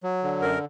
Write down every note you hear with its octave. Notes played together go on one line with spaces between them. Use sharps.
F#3
D3
F#2 A#4